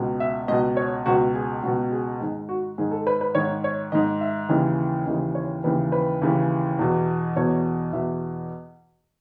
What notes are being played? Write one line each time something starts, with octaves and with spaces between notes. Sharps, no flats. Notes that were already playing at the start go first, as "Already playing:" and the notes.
Already playing: C#2 B2
E5
C#2 B2 D#5
C#5
C#2 B2 F#4
G#4
C#2 B2 F#4
G#4
G#2 D#3 G#4
F#4
G#2 D#3 G#4
A4
B4
B4
G#2 D#3 C#5
C#5
G#2 D#3 D#5
E5
D#2 C#3 E3 D#5
D#2 C#3 E3 D#5
C#5
D#2 C#3 E3 B4
B4
D#2 C#3 E3
E2 B2
E2 B2 C#5
E2 B2 E5